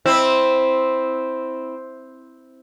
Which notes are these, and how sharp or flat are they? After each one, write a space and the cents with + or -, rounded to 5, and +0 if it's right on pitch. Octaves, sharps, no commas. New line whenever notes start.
C4 +0 E4 -10